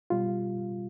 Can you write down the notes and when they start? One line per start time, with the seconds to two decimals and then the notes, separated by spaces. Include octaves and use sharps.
0.10 B2 G3 F4